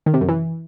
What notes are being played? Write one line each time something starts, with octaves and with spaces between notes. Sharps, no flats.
D#3
C3
F#2
E3